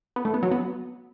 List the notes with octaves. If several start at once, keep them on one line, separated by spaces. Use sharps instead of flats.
B3
A3
B3
F#3
B3